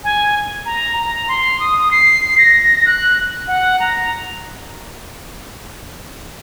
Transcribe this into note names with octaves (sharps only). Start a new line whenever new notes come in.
G#5
A#5
A#5
C6
D#6
C7
A#6
F#6
F#5
A#5